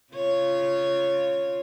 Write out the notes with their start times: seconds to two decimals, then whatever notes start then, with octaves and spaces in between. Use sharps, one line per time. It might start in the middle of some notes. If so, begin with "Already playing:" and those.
0.14 C#3 F4 C#5